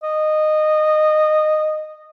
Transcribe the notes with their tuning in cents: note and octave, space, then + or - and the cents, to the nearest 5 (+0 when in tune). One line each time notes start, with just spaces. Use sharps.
D#5 -15